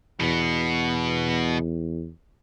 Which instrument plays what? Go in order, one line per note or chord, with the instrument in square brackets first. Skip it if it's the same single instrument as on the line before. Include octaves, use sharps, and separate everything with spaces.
[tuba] E2 [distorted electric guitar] B2 B3